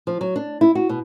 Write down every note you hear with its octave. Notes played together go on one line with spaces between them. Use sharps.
F3
F#3
D4
E4
F#4
B2